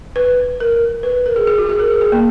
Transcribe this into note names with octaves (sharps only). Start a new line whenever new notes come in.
B4
A#4
B4
A#4
G#4
G#4
F#4
G#4
A#4
G#4
G#4
A#3